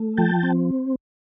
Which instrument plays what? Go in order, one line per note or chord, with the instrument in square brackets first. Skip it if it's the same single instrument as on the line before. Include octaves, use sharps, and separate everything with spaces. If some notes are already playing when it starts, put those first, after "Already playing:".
Already playing: [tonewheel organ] A3
F3 G5 A5
C4